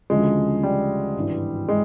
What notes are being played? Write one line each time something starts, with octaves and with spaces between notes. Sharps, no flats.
D2 C#3 F3 G#3
G3
G#1 G2 E3
G#3